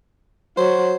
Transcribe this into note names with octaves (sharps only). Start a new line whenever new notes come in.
F#3 C5